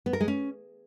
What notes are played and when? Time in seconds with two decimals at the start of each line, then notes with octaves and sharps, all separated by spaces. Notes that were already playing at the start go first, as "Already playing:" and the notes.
0.06 B3
0.13 A#4
0.20 G#3
0.28 C#4